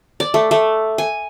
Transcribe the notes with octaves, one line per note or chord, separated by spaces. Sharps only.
D5
A3
A3
G#5